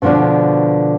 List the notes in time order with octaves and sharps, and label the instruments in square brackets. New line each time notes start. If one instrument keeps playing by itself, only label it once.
[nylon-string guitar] B2 D3 F3 B3 D4